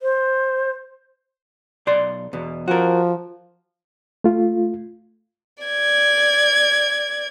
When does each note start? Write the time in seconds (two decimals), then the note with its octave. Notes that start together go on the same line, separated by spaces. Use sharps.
0.02 C5
1.87 B1 D5 C6
2.33 E2 B2
2.68 F3 F#4 A#4
4.24 A3 F4
5.64 D5 G#6